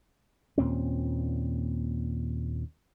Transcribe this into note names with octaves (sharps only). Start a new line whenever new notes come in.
D#2 A#2 C4 C#4